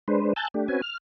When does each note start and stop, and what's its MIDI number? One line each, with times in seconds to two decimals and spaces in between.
0.08 0.33 56
0.08 0.33 62
0.08 0.33 71
0.08 0.33 72
0.36 0.48 80
0.36 0.48 81
0.36 0.48 88
0.36 0.48 90
0.36 0.48 91
0.36 0.48 93
0.54 0.68 57
0.54 0.68 62
0.54 0.68 67
0.68 0.81 60
0.68 0.81 61
0.68 0.81 66
0.68 0.81 71
0.68 0.81 80
0.82 0.98 89